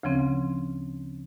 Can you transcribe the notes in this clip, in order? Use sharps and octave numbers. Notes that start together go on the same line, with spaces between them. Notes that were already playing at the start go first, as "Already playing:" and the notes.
D2 C#3 F3 C4 C#4